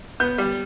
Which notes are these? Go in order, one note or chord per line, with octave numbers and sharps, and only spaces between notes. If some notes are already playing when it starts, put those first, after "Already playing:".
B3 G6
G3